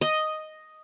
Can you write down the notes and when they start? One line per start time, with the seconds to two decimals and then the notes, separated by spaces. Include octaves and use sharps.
0.01 D#5